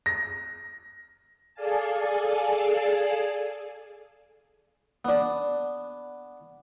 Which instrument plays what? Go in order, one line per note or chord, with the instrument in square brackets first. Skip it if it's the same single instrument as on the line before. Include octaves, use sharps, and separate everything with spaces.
[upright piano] A#6
[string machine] G#4 A4 D5 F5 G#5 A5
[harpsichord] B3 D4